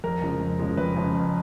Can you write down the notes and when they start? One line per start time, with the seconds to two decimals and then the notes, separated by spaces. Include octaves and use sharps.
0.04 F2 A#4
0.22 C#3 F3 G#3
0.41 F2
0.59 C#3 F3 G#3
0.77 F2 B4
0.96 C#3 F3 G#3
1.15 F2